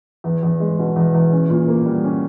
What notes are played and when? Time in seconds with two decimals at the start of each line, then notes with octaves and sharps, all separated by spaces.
0.24 E2
0.43 E2
0.60 G#3
0.79 B2
0.96 E2
1.14 E2
1.32 C#4
1.50 A#2
1.68 A#3
1.86 G3
2.04 C#4